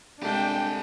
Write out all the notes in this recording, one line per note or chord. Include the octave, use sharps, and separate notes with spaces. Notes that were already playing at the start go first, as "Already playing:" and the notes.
C2 G#3 D4 G4 A4 G5